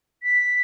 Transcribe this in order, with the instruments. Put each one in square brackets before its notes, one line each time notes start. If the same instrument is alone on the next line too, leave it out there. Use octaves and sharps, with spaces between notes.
[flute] B6